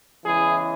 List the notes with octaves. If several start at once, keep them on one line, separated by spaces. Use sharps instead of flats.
E2 C#3 E3 G#3 E4 G#4